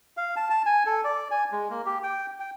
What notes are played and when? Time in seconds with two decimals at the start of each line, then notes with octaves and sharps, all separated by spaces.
0.17 F5
0.36 A5
0.50 A5
0.66 G#5
0.86 A4
1.04 D5
1.31 G#5
1.52 G#3
1.70 A#3
1.86 G4
2.03 G5
2.40 G5